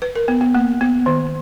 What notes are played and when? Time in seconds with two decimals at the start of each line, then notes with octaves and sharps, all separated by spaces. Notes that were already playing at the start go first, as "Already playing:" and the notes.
0.02 B4
0.15 A#4
0.28 B3
0.41 B3
0.55 A#3
0.81 B3
1.06 D#3